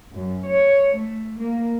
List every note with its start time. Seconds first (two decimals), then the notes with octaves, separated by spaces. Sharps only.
0.13 F#2
0.47 C#5
0.96 A3
1.39 A#3